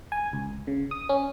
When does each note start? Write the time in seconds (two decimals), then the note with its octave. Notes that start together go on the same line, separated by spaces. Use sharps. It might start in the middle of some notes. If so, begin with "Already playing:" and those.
0.12 G#5
0.33 C#2
0.67 C#3
0.91 D#6
1.09 C#4